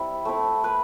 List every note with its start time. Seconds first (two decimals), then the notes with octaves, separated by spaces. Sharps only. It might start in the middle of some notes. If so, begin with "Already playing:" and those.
Already playing: G3 C4 E4 B4
0.25 A3 C4 E4
0.64 B4